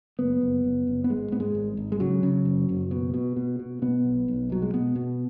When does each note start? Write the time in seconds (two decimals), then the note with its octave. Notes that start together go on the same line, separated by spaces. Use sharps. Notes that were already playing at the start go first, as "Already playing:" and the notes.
0.19 F#1 B3
0.41 F#1
0.64 F#1
0.87 F#1
1.04 B3
1.09 G#1 G#3
1.32 G#2 B3
1.40 G#3
1.55 G#1
1.77 G#1
1.92 G#3
2.00 C#3 F#3
2.23 C#3
2.45 F#1
2.69 F#1
2.91 B2
3.14 B2
3.36 B2
3.59 B2
3.82 B2 B3
4.04 B1
4.28 B1
4.50 B2 F#3
4.62 G#3
4.74 B2 B3
4.95 B2